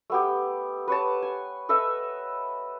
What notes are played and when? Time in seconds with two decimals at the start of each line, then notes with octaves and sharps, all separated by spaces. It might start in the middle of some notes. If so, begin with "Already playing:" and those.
0.10 A3 B3 G4
0.88 B4 C#5 A5
1.22 G#5
1.69 A4 B4 D#5 E5